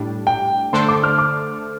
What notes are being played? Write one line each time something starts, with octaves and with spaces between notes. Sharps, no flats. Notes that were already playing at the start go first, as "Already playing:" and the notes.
Already playing: A2 G3 D4
G5
D3 A3 D4 A4 C5 C6
D6
F6
D6